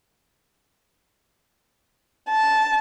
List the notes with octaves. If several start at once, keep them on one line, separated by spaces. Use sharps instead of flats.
A5